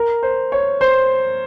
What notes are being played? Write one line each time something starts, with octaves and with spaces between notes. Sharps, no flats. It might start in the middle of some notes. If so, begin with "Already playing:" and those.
Already playing: A#4
C5
C#5
C5